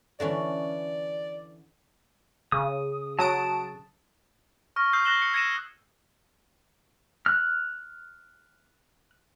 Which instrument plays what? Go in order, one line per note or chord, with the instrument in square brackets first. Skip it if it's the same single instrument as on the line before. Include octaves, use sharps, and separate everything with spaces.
[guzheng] D3 E3 C#4 [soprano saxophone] D5
[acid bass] C#3 [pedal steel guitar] D#6
[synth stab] F#3 D#6 D7 [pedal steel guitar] A5
[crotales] C#6 F6 A#6
D#6 E6 G6 C7
F#6 A#6 E7 F#7 G7
C#7
G#6 A#6 C#7 D#7 E7
[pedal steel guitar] F6 F#6